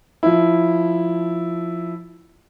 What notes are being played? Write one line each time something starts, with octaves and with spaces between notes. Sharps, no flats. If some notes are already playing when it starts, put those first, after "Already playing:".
F3 E4